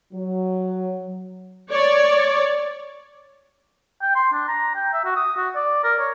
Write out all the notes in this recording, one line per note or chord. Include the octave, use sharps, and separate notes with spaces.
F#3
C#5 D5
G5
C6
D4
A#5
G5
E5
F#4
D#6
F#4
D5
A#4
C#5